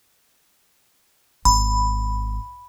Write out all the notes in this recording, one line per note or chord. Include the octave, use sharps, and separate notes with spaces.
G#1 B5